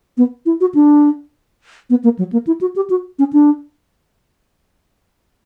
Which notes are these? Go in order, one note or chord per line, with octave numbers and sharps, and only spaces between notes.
B3
E4
F#4
D4
B3
A#3
F#3
A#3
E4
F#4
G4
F#4
C#4
D4